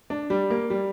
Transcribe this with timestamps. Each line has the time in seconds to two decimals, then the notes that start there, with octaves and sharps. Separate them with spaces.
0.10 D4
0.30 G3
0.50 A#3
0.70 G3